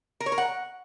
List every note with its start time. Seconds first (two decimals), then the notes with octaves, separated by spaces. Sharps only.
0.20 A#4
0.26 C#5
0.32 A#4
0.38 F#5